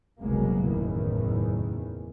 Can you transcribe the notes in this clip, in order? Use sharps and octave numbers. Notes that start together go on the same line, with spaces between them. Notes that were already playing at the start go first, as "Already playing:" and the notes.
F#1 C2 B2 F#3 G#3 A#3
F#1 E2 A2 D#3 E3